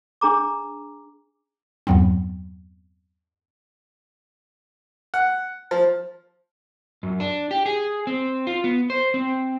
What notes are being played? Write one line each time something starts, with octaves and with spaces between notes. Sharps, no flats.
D4 G#4 A#5 D6
E2 G2 F#3 B3 C4
F#5
F3
F#2
D4
G4
G#4
C4
F4
B3
C5
C4